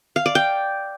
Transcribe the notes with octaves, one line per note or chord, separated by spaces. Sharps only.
F5
D5
G5